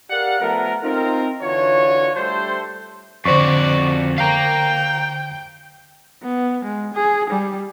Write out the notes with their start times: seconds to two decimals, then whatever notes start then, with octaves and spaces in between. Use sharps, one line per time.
0.10 G4 A#4 D5 F5 F#5
0.41 F3 A3 B3 A#4
0.83 C4 D#4 F4 A#4
1.43 D3 E3 F4 F#4 C#5
2.15 G3 A3 D4 A4 C5
3.25 F2 D3 F#4 C5 D5 C#6
4.18 F5 G5 A#5
6.23 B3
6.65 G#3
6.94 G#4
7.30 G3